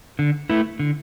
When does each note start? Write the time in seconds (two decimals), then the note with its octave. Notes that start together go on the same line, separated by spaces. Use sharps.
0.19 D3
0.50 A3 E4 B4
0.79 D3